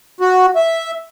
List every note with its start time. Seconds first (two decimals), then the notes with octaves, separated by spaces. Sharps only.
0.20 F#4
0.56 E5